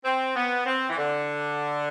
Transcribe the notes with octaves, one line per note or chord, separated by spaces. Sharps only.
C4
B3
C4
E3
D3